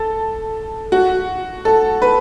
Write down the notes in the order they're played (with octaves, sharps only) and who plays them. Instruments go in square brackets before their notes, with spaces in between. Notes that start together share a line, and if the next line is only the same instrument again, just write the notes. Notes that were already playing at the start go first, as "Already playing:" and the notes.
Already playing: [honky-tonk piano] A4
F#4
A4
B4